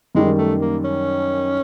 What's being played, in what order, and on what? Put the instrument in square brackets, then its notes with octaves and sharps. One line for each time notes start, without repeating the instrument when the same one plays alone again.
[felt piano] F#2 D#3 G3 [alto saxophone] G#3
[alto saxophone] A3
A#3
C#4